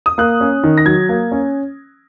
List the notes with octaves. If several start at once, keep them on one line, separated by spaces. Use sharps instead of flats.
D#6
A#3 F#6
C#4
D#3
A#6
F#3 G#6
A#3
C#4